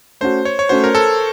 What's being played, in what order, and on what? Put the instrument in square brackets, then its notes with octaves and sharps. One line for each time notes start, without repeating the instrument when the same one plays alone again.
[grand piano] A3 C#4 F#4 [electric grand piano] C5
[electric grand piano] C#5
C#5
[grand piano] A3 C#4 F#4 [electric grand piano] C5
[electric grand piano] A#4
A4